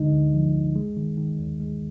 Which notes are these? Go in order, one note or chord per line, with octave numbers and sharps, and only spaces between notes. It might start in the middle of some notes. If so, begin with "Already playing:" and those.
Already playing: D2 D3 G#3 D#4
D2
F3
D2
G#3
D#3
D#3
D#2
G#3